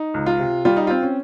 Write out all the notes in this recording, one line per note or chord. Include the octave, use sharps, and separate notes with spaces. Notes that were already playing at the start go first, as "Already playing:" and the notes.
Already playing: D#4
C#2
F4
C3
G3 F4
D#4
C4 F4
C#4